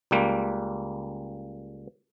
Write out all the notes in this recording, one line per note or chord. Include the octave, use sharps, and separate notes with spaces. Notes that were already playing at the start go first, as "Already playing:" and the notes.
C#2 G3 A#3